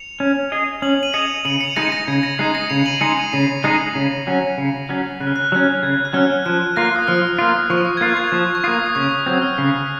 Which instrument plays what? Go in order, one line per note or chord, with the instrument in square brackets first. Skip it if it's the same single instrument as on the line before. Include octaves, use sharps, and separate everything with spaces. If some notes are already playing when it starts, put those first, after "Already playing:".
Already playing: [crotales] C#7 F7
[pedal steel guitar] C#4
G#4 D#5
[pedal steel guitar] C#4 [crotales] F#7
[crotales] D#7 F#7
[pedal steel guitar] G#4 D#5 [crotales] C#7 F7
[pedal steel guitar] C#3 [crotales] D#7 F#7
[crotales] C#7 F7
[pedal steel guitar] G#3 D#4 G#4 [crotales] A#6 C#7
[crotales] A#6
[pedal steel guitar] C#3 [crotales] G#6
[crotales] A#6
[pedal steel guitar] G#3 D#4 G#4 [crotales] C7
[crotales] A#6 C#7
[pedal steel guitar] C#3 [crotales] C#7 F7
[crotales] D#7 F#7
D#7
[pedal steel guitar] G#3 D#4 G#4 [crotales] C#7 F7
[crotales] F7
C7 D#7
[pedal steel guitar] C#3 [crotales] C7 D#7
[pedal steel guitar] G#3 D#4 G#4 [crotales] A#6 C#7
[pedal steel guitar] C#3
F#3 C#4
C#3
F#3 C#4
[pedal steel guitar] C#3 [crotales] F#6
[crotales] F6
F#6
[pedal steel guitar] F#3 C#4 [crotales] F#6
[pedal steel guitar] C#3 [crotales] G#6
[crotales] F#6
[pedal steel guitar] F#3 C#4 [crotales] F6
[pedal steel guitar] F3 [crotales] F#6
[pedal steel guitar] A#3 F4 [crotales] A#6
[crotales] D#6
[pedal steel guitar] F3 [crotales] F6
[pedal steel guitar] A#3 F4 [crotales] D#6
[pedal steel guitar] F3 [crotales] C#6
[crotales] D#6
G#6
[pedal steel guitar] A#3 F4 [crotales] F#6
[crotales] G#6
[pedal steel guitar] F3
[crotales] C#6
[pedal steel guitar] A#3 F4 [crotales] D#6
[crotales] D#6
[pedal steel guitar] C#3 [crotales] C#6
[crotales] D#6
[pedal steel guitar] F#3 C4 [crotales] D#6
[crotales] F6
[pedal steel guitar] C#3 [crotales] F#6